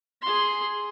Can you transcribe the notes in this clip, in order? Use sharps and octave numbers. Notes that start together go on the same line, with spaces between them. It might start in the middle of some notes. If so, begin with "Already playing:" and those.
G#4 C6